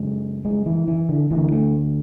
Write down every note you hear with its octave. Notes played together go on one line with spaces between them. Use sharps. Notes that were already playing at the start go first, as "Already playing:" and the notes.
Already playing: F#2 C#3 G#3
G#3
E3
E3
D3
D2 D3 E3
A3